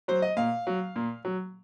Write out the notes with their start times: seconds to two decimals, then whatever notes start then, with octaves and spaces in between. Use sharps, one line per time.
0.08 F#3 C5
0.22 D#5
0.37 A#2 F5
0.67 F#3
0.96 A#2
1.25 F#3